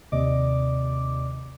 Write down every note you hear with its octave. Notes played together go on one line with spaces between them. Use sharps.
D#2 C3 D5 D#5 D6